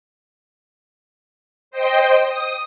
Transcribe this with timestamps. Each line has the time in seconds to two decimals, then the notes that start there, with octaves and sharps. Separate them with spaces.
1.71 C5 D#5 G5
2.22 D#6